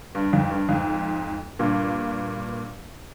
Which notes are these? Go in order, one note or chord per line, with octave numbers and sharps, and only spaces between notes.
G2
F2 G#2
G2
F2 G#2
G2 A#2